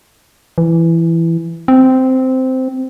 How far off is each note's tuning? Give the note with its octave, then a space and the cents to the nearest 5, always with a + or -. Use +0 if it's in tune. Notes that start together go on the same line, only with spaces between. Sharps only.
E3 +10
C4 -10